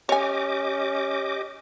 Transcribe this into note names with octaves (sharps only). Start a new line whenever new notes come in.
C#4 G4 C#5 D#5 G#5 D6